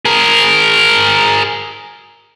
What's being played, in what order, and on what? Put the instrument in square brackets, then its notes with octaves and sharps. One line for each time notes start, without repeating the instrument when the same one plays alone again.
[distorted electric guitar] G#4 A#4